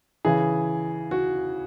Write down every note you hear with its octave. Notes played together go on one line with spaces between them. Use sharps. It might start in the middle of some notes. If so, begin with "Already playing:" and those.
C#3 E3 G#4
F#4